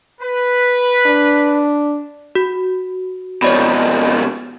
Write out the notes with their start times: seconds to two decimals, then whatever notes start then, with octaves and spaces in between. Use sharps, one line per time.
0.21 B4
1.06 D4
2.35 F#4
3.42 F2 B2 C#5 D5 B5